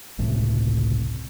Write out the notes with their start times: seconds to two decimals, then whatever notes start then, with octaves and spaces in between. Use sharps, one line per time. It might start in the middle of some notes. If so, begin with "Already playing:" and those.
0.18 G1 C#2 A2 C3